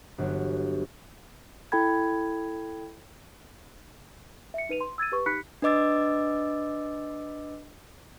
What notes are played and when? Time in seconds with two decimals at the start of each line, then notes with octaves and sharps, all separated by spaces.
0.18 G1 F#3 B3 C#5
1.72 E4 A4 G5 B5 G#6
4.54 E5 C#7
4.69 D#4 B4 D#7 F7
4.81 C6
4.98 E6 G#6 A6 D#7
5.12 G4 B4 C#6
5.26 D#4 G4 B5 F#6 B6 C#7
5.62 D4 B4 D#5 D6 E6 A6